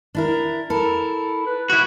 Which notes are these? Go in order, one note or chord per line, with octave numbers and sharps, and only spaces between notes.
D4 E4 A#4
E4 A4 A#4
B4
E4 F#4 C#6